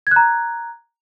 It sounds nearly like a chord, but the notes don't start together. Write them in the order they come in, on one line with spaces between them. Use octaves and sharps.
G#6 F#6 A#5